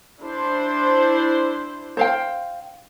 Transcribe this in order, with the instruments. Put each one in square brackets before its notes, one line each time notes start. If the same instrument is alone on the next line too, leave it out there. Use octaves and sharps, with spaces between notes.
[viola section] D4 E4 C5
[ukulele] C5 F5 G5